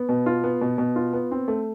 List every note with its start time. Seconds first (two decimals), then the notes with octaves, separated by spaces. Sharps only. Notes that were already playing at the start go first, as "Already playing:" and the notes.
Already playing: B3
0.09 B2
0.26 F4
0.44 B3
0.61 B2
0.78 B2
0.96 F4
1.13 B3
1.31 C4
1.48 A3